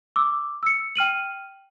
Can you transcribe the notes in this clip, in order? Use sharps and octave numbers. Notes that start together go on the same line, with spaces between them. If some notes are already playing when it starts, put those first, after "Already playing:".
D6 E6
E6 C#7
G5 F6 D#7 F#7